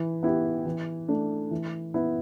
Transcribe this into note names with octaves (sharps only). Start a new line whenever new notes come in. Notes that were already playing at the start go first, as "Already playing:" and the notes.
Already playing: E3
B3 E4 G4
E3
A3 D4
E3
B3 E4